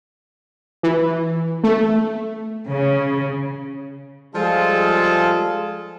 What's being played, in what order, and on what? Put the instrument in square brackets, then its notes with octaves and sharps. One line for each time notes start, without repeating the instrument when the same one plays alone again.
[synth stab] E3
A3
[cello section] C#3
[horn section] F3 G3 G#3 F4 G#4 A4